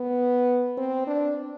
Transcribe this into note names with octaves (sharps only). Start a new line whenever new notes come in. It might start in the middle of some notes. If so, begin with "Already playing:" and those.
Already playing: B3
C4
D4